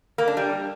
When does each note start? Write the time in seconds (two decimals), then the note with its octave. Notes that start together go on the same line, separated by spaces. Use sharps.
0.18 A#3
0.28 D4
0.37 G3